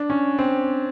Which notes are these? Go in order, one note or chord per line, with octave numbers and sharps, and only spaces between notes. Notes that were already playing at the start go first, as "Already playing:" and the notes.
Already playing: D4
C#4
C4